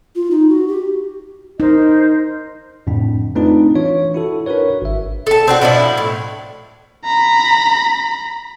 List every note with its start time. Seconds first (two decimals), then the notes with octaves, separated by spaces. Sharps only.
0.15 F4
0.31 D#4
0.49 F#4
0.68 G4
1.60 D#4 A#4 C5 D#5
2.87 F2 A2 C#3 D4
3.35 A3 C4 D4 D#4 F4 B4
3.75 E3 D4 F4 C#5
4.14 E4 F#4 A4
4.46 D4 F#4 A#4 B4 C#5
4.82 G#1 E5
5.27 A4 A5
5.48 C4 D4 F#4
5.61 B2 F3 D4 E4
5.98 A2
7.05 A#5 B5